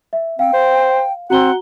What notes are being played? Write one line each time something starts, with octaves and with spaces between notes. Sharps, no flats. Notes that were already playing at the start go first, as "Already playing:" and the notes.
E5
C4 F5 G5
C5
C4 F#4 F#5 A#5 G7